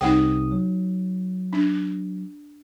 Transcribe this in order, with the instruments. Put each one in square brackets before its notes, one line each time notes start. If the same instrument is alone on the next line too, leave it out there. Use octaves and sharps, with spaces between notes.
[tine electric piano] C2 C3 D#6 [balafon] D#4 F#5 G5
[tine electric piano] F#3
[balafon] D4